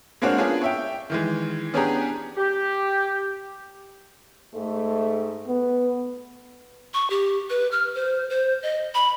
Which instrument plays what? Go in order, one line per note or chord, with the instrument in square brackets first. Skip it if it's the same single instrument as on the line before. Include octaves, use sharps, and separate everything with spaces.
[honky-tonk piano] G#3 A#3 C4 D4 F#4 C#5
B3 C#4 D4 F4 G#4
C#5 E5 G5
D#3 E3 G#3
B3 C#4 D4 G4 G#4 A#5
[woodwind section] G4
[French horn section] G#2 A3
[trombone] B3
[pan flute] C#6
G4
B4
F6
C5
C5
D#5
B5